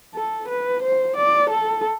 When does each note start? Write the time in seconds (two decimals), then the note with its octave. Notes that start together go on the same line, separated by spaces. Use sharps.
0.15 A4
0.48 B4
0.82 C5
1.17 D5
1.50 A4